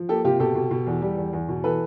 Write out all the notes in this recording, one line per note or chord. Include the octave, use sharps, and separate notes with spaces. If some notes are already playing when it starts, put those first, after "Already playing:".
Already playing: F3
A#3 G4 A4
C3 F4 G4
B2 G4 A4
B2
B2
E2
G3
E2
E2
B2
E3 A4 B4